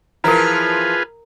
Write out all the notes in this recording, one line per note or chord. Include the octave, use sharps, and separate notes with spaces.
E3 F3 E4 F4 G#4 A#4 B4 A#5